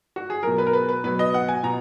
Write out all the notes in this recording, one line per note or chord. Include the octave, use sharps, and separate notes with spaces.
F#4
G#4
B2 F#3 A#4
B4
A#4
B4
B4
B2 F#3 B4
D#5
F#5
G#5
B2 A#5